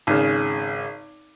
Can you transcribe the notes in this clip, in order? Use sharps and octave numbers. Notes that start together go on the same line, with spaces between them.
G#1 C#3